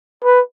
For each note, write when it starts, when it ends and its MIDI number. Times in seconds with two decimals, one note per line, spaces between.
0.24 0.40 71